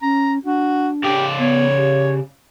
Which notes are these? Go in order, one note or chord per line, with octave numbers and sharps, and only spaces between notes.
C#4 A#5
D4 F#4
C#3 G4 D5
B3 C#5
G4